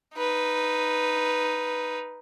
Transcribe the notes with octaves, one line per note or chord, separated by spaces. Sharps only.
D#4 B4